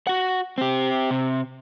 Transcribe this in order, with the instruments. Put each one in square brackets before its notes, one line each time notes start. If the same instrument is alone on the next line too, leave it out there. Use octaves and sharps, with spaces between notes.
[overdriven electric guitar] F#4 F#5
C4 G4
C3